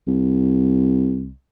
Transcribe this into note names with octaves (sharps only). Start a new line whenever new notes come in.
C2